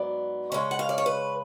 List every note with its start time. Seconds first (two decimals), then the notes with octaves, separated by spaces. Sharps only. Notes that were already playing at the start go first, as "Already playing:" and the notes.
Already playing: G#2 F#3 B3 D5
0.52 C#3 G#3 C#4 C#5
0.71 F#5
0.79 F5
0.89 D5
0.98 C#5
1.06 B4